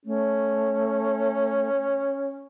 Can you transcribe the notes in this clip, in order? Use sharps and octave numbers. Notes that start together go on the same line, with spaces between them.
A3 C#4